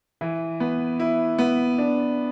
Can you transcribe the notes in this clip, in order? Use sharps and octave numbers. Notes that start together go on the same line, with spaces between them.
E3
B3
E4
B3
D4